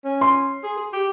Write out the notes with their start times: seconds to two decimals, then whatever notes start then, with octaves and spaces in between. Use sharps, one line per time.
0.05 C#4
0.21 C6
0.63 G#4
0.77 G#4
0.93 G4